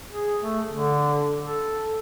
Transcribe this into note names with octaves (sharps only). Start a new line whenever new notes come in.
G#4
A3
D3
A4